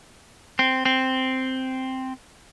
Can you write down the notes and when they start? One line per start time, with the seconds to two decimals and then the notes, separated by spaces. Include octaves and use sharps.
0.59 C4
0.85 C4